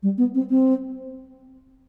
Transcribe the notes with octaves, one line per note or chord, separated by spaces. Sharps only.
G3
B3
C4
C4